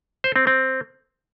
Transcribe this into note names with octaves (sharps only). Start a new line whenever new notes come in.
C5
C4
C4